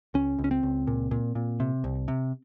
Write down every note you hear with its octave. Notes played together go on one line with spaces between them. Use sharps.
C#2 C#4
C#2
C#4
C4
C#2
A#2
A#2
A#2
C3
C2
C3